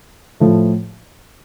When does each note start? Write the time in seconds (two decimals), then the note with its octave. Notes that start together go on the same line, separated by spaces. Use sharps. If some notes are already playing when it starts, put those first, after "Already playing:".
0.40 A2 F3 A3